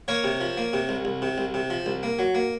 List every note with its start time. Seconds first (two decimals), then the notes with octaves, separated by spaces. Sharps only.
0.08 A#3 A#4 C#5
0.24 C3
0.41 F3
0.57 A#3
0.73 C3
0.89 C2
1.05 C2
1.22 C3
1.38 C2
1.54 C3
1.70 F3
1.86 C2
2.03 A#3
2.19 F#3
2.35 A#3